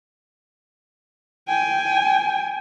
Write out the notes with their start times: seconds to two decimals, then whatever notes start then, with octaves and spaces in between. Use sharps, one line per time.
1.48 G5 G#5